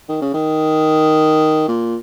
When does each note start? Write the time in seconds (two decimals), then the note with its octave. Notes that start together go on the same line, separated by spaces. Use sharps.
0.09 D#3
0.22 C#3
0.34 D#3
1.68 A#2